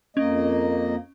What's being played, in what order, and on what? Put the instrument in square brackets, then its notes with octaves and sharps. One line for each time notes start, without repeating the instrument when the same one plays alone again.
[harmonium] F2 A#3 D#5 [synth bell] C#4